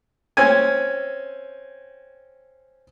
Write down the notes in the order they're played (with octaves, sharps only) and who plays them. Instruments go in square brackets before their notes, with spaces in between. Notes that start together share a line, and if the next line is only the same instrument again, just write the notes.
[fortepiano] C4 C#4 G#5